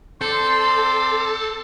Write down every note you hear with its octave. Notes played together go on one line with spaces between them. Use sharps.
C4 A4 D5 C6